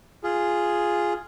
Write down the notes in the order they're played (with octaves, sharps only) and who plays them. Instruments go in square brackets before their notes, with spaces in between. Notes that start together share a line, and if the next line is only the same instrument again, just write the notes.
[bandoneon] F4 G#4